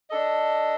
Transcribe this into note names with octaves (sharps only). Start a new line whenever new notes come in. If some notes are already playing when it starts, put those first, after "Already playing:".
D4 A4 D#5